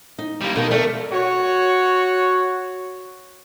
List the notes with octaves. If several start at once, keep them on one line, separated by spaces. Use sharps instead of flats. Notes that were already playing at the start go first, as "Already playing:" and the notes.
D#4
G3 A#3
B2 D#3 A#4 A5
A3 A4 A#4 D5
F#4 C#5